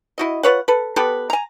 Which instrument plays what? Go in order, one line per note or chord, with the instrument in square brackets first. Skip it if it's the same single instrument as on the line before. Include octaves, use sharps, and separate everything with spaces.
[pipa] E4 F#4 D#5
F4 B4 C#5 F#5
A4 B4
B3 G4 A4 B4
G#5 A#5